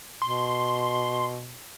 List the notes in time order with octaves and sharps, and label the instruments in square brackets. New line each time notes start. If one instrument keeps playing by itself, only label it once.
[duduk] B2 [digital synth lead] C6